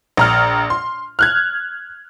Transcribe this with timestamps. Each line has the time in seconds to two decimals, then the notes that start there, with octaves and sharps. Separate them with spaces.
0.17 A#1 A#5 F6
0.70 C6
1.19 F6 F#6 G#6